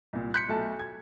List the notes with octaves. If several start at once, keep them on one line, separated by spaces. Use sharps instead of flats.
C2 A#2
C6 F#6 G6 B6 C#7
B1 A3 A5
G#6